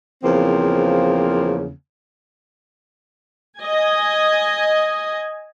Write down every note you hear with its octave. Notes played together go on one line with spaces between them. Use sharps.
E2 C#3 F3 A#3 C4
D#5 G#5